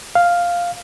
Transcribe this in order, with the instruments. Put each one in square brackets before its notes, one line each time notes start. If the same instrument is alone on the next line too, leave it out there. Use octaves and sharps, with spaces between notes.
[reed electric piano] F5